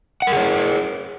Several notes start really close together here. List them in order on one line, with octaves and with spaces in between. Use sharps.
F#5 A#4 G#4 C#5